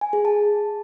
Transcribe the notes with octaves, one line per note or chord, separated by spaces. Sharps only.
G#5
G#4
A5